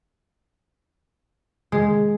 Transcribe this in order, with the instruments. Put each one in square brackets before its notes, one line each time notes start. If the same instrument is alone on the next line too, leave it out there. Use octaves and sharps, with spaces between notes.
[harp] G#3